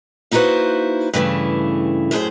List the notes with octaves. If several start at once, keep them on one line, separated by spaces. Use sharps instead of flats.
A#3 D#4 E4 F#4 B4 C5
G2 C#3 E3 A3
F#2 A2 D#4 G#4 C5